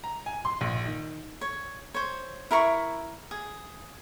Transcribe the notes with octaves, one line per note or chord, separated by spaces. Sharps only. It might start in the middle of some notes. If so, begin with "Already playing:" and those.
A#5
G#5
C6
A#1
D#3
C#5
C5 C#5
E4 A#4 B5 C#6
G#4